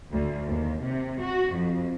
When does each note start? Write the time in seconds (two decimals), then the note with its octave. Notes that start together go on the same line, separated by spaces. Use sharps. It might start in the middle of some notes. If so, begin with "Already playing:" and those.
0.12 D2
0.48 D#2
0.83 C3
1.22 F#4
1.56 F2